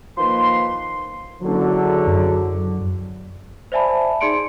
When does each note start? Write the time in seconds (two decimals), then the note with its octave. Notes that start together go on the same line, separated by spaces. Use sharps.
0.18 D#3 F3 A#3 B4 C6
1.42 F#1 D3 F#3
2.07 F#2
3.72 C5 D5 E5 G#5 A5 B5
4.21 D#4 G#4 D5 C6 C#7 D7